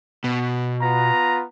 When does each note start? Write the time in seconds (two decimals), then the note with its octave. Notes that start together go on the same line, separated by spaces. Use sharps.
0.24 B2
0.82 B3 F4 A#5